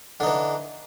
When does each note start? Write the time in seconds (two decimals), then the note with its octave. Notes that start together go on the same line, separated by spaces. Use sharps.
0.20 D3
0.23 D#4
0.26 E3